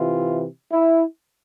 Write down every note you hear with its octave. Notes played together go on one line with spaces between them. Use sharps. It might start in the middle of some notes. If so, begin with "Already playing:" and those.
Already playing: C3 E3 F4
E4